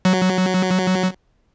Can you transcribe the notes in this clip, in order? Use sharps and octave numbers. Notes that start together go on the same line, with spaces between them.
F#3